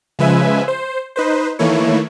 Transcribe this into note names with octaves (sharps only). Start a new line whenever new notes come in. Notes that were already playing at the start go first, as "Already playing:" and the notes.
C#3 F3 G#3 B4 E5 G#5
C5
D#4 B4 C5
D#3 E3 A3 A#3 E4 C#5